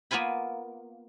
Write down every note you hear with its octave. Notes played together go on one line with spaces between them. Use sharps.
A#3 B3 F4 G#5 B5